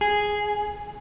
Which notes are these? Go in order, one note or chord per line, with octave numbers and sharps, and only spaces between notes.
G#4